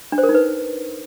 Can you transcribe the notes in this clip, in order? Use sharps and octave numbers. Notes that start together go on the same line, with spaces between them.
D4
C5
A#4
D#4
B4